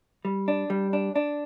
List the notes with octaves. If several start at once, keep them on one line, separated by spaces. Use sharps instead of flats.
G3
D4
G3
D4
D4